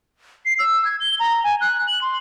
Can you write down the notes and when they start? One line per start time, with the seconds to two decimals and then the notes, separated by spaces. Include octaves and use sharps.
0.45 C7
0.59 E6
0.85 G#6
1.00 G7
1.20 A#5
1.44 G#5
1.61 F#6
1.87 F#7
2.02 C6